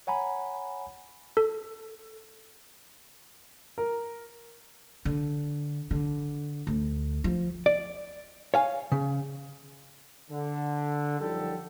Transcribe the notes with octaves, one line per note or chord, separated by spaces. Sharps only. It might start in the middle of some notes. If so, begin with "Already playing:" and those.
C#5 F#5 G#5 A#5 B5
A4
A#4
D3
D3
D2
F3
D5
C#5 F5 G#5
C#3
D3
F#2 F3 G3 D#4 G4 A4